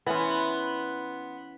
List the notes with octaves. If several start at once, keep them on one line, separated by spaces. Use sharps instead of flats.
E3 B3 C#4 B5 C6